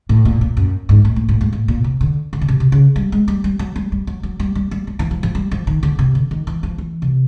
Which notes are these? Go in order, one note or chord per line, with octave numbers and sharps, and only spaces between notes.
A2
A#2
A#2
F#2
G#2
A2
A2
A2
G#2
A2
A#2
C3
D3
D3
C#3
C3
C3
C#3
G3
G#3
G3
G3
F#3
G3
G3
F#3
F#3
G3
G3
G3
F#3
E3
F3
F3
G3
F3
D#3
D3
C3
D3
D#3
E3
F3
E3
C3